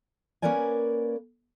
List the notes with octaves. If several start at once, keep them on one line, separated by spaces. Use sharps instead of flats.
A#3 C#4 A#4 B4 D5 G#5